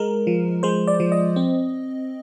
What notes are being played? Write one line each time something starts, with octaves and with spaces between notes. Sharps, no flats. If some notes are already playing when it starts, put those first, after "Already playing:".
Already playing: G#3 A#4
F3
G#3 C5
D5
F3
D#5
C4